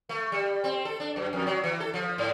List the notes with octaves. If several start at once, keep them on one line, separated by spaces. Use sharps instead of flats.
A3
G3
C4
A4
D4
F#2
F2
F#3
E3
A4
F3
G#2